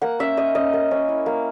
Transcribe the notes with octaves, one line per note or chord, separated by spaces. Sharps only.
A#3 F#5
C#4 E5
C#4 D#5
C#4 D#5
A#3
C#4
E4
A#3